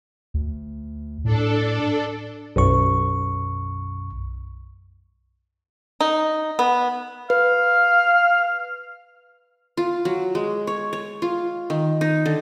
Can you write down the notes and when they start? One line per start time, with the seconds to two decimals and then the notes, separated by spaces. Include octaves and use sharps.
0.34 D2
1.24 A2 D4 A4
2.56 B1 F#2 C#6
6.00 D#4
6.59 B3
7.30 B4 F5
9.77 F4
10.05 F#3
10.35 G#3
10.67 C#5
10.93 C#5
11.22 F4
11.70 D#3
12.01 D#4
12.26 D3